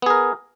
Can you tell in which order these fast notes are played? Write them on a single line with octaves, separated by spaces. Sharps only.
B3 G#4 A#4